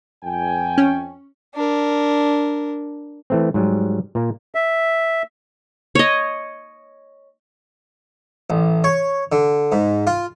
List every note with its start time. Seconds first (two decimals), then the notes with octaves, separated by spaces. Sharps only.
0.23 F2 G5 G#5
0.78 C#4
1.55 D4 A#4
3.30 E3 A3 C4
3.54 G#2 F#3 G3
4.15 A#2 A#3
4.55 E5
5.95 C#5 D#5
8.50 A1
8.84 C#5
9.32 D3
9.72 G#2
10.07 F4